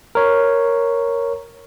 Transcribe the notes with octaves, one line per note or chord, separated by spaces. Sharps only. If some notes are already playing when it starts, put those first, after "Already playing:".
A#4 C#5